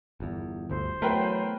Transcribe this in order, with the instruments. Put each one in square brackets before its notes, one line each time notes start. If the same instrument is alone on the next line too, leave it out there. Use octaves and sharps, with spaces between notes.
[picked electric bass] G1 E2
[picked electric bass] G1 D2 [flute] C5
[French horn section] E2 F#3 [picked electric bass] A3 [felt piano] A#4 B4 G5